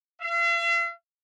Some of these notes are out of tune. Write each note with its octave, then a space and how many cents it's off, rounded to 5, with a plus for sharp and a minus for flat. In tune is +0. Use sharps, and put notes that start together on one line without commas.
F5 -45